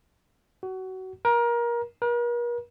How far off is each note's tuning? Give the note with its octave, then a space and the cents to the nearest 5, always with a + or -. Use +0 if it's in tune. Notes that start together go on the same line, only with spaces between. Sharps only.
F#4 +25
A#4 +25
A#4 +45